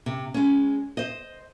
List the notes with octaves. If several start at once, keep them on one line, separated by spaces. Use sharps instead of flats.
C3
G#3 C#4
C5 D#5